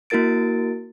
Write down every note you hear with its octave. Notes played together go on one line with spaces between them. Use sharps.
A#3 E4 F#4 A#4 A6 D7